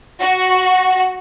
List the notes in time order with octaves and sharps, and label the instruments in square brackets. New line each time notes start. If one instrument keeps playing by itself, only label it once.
[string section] F#4